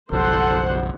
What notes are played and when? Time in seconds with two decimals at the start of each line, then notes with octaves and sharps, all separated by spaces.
0.12 F#1 B1 F3 A4 C5 F#5